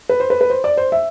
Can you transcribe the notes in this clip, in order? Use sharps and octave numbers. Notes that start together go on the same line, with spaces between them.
B4
C5
B4
B4
C5
D5
C5
E5